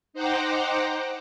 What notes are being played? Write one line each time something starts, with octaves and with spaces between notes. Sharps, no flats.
D#4 C5 F#5 G5 A#5 D6